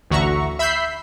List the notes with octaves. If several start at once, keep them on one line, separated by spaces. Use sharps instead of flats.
A1 D2 F#4 E5 A#5 C#6
E5 B5 E6 G6 B6 C7